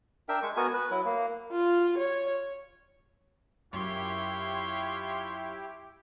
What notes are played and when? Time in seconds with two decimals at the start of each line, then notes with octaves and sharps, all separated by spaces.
0.29 D4 A#4 E5 G5
0.43 G#3 C#6
0.57 B3 F#4 A#4 G#5
0.74 B4
0.91 F#3 E4
1.06 A#3
1.52 F4
1.98 C#5
3.73 F#2 E4 F4 G4 C#5 C6